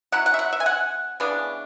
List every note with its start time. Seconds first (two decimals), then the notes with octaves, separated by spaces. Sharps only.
0.12 F#3 C#4 E4 F#5
0.26 F#5
0.34 E5
0.39 F#5
0.53 E5
0.60 G#5
0.66 F#5
1.20 C#3 E3 B3 D4